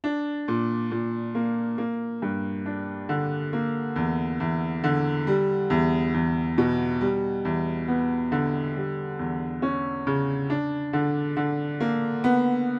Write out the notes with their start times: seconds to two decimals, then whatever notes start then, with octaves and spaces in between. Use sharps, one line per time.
0.04 D4
0.48 A#2
0.91 A#2
1.35 A#3
1.78 A#3
2.22 G2
2.66 D4
3.09 D3
3.53 A#3
3.96 E2
4.40 E2
4.84 D3
5.27 G3
5.70 E2
6.14 E2
6.58 B2
7.01 G3
7.45 E2
7.88 B3
8.32 D3
8.76 G3
9.19 E2
9.62 C#4
10.07 C#3
10.50 D4
10.93 D3
11.37 D3
11.80 A#3
12.24 B3